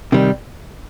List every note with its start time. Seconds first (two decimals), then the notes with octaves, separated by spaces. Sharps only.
0.12 C3 D#3 G3